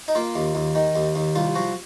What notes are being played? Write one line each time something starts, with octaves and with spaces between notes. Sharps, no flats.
D#4
A#3 F4
D#2
D#2
D#3
D#2
D#2
C2 F4
F3 F#4